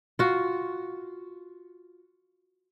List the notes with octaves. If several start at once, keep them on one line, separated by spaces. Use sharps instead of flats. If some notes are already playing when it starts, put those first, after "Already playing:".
F4 F#4